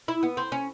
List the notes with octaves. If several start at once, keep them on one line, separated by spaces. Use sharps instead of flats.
E4
B3
C4
C#4